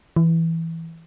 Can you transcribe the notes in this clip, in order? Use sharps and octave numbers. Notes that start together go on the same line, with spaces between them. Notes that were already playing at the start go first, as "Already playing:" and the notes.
E3